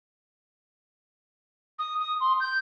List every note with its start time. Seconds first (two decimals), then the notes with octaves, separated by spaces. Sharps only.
1.79 D#6
1.99 D#6
2.20 C6
2.40 G6